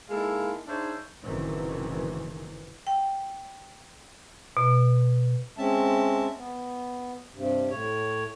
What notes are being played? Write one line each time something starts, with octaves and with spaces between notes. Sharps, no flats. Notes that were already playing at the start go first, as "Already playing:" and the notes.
G#3 A#3 D#4 E4 A4 F5
D4 D#4 G#4 C5 C#5 E5
F#1 A2 C3 D#3 E3
G5
B2
G#3 C4 C#4 E5 A5
B3
G2 C3
A2 C#5